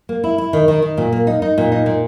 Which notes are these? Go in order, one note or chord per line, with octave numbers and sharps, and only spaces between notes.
A#3
E4
E4
D#3
D#3
D#3
A#2
A#3
D#4
D#4
A#2
D#4
A#2